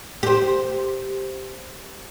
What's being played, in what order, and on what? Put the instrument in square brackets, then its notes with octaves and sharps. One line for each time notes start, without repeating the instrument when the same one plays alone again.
[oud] G4 C5